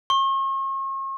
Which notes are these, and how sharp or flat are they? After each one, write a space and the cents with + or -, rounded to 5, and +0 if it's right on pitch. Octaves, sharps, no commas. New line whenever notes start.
C#6 -40